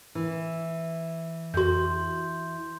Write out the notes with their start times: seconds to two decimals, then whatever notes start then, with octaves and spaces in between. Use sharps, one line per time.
0.15 E3
1.54 F2 F#4 C6 G6